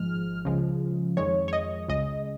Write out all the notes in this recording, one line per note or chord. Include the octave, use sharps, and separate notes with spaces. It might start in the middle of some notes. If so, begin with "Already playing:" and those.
Already playing: G#1 G#2 F3 G#3 F6
C#2 C#3 F3 G#3
F2 D#3 G#3 C#5
C#5
D#5
C#2 C#3 G#3 D#5